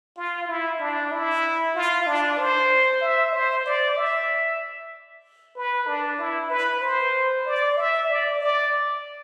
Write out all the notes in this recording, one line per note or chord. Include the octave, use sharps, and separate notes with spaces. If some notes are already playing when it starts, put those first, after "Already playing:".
F4
E4
D4
E4
F4
D4
C5
E5
C5
D5
E5
B4
D4
E4
B4
C5
D5
E5
D5
D5